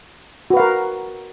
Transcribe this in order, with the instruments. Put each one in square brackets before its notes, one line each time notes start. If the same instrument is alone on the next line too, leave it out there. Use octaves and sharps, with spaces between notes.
[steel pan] F#4
B4
F5
A#4